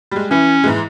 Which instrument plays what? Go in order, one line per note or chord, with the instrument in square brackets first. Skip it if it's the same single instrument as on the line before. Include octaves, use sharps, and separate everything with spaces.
[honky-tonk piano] G3 G#3
[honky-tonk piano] E3 [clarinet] C#4
[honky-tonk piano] G#2 E3 G#3